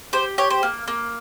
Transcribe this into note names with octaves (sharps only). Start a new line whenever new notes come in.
G4 C5
G4 C#5
C5
A#3
A#3